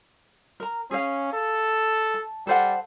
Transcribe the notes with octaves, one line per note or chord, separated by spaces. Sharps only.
A#4 A#5
C#4 G#4 F5
A4
A5
G3 A4 C5 F#5